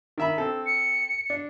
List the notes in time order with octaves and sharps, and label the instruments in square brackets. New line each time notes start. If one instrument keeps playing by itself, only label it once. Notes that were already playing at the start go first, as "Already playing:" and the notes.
[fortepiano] D#3 E5 B5
C4 A4
[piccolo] C#7
[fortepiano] D4